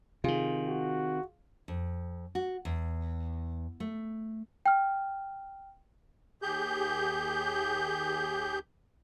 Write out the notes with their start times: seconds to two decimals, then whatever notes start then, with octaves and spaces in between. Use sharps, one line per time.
0.24 C3 D#3 F4 G#4
0.67 F#4
1.68 F2
2.35 F#4
2.65 E2
3.80 A3
4.66 G5 F6
6.42 D#2 G4 G#4 G6